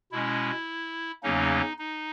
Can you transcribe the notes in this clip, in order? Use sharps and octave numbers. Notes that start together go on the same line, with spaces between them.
B2 G#3 C#4 E4
E2 C#3 F#3 A#3 C#4 D#4
D#4